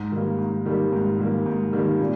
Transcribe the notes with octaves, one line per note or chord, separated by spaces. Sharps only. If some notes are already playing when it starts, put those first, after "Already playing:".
Already playing: G#2
D#3 G3 A#3
G#2
D#3 G3 A#3
G#2
D#3 G3 A#3
G#2
D#3 G3 A#3
A#2